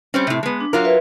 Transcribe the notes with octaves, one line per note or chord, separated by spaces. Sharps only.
G3 C4 C#4
A2 C3
G#3 B3
D4
F#3 F4 A#4
B4 E5